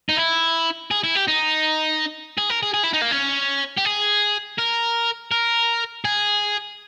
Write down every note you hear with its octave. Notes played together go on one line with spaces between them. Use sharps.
D#4
E4
G#4
E4
G4
D#4
G#4
A#4
G#4
G#4
E4
D#4
A#3
C#4
G4
G#4
A#4
A#4
G#4